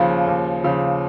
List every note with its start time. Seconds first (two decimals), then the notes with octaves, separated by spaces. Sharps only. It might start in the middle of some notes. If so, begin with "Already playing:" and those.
Already playing: D#2 C#3 F3
0.27 D#2
0.64 C#3 F3